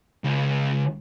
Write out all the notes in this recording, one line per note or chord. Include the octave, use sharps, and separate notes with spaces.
C#2